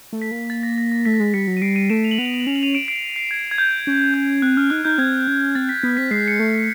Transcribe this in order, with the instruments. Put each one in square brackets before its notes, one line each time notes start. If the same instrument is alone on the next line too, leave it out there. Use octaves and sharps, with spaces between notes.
[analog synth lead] A3
[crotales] B6
[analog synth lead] A#3
[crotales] A6
A#6
A#6
A#6
[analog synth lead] A3 [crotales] B6
[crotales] A#6
[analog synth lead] G#3 [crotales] B6
[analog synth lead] G3 [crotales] B6 C#7
[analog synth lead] F#3
[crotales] D#7
[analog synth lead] G3 [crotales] C7 D7
[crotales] C#7 D#7
[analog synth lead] A3 [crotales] D7 E7
[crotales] F7
F#7
[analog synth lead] B3 [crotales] F7
[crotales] F#7
F7
F#7
[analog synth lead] C#4 [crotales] F7
[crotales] F#7
D#7 F7
D7 E7
C7 D7
C7
G#6
G#6
G6
[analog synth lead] C#4
[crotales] G6
[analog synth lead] C4 [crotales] F#6
[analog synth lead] C#4 [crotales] F6
[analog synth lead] D#4 [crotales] F#6
[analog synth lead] D#4 [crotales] G6
[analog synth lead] C4 [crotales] G#6
[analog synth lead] C#4
[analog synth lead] C4 [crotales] A6
[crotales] B6
[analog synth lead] B3 [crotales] B6
[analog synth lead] C4 [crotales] B6
[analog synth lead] G#3 [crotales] C7
[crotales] C#7
[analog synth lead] A3 [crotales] C7